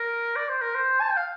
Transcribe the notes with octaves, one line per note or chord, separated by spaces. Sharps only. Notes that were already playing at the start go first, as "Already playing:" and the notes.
Already playing: A#4
D5
C5
A#4
C5
A5
G5
F5